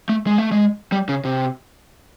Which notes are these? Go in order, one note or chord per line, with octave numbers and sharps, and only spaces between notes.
A3
G#3
A3
G#3
G3
C#3
C3